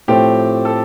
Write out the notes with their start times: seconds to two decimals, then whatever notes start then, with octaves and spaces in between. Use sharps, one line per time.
0.08 A2 F3 A3 C4 G4
0.65 A4